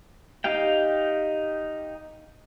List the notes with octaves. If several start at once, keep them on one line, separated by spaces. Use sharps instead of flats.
D#4 G4 F5 G5